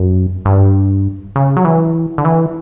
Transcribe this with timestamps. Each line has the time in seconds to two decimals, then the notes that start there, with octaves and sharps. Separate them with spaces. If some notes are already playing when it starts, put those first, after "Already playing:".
Already playing: F#2
0.45 G2
1.36 C#3
1.57 F#3
1.64 E3
2.18 D3
2.25 E3